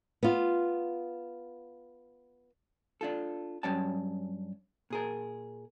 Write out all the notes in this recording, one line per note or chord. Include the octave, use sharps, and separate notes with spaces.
B3 F4
D4 F4 A4
G2 F#3 C#4 C#5 G5 A5
A#2 G#4 A#4